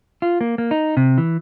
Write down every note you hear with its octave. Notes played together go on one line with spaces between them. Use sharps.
F4
A#3
A#3
D#4
C3
E3